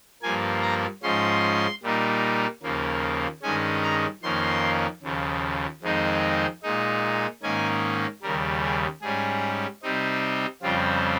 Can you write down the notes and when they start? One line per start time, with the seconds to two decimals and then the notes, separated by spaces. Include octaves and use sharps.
0.22 G2 F3 A#3 G#5
0.62 A#5
1.03 G#2 F3 G#3 C#4 C6
1.83 A#2 G3 A#3 D#4
2.63 D#2 C#3 F3 A#3
3.42 G2 D#3 G#3 C#4 G#5
3.83 A#5
4.23 F2 D#3 A#3 C#4 C6
5.03 D#2 C#3 F3
5.82 F2 D#3 G#3 C4 D#4
6.63 A#2 G#3 D#4
7.42 G#2 D#3 A#3 C#4 G#5
8.22 D#2 C#3 G3 A#4
8.63 G#4
9.02 G#2 G3 C#4 G#4
9.83 C3 G3 C4 D#4
10.62 F2 C#3 G3 C4 F4